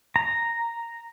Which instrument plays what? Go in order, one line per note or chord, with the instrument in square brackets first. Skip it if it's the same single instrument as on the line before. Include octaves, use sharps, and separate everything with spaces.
[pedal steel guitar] A#5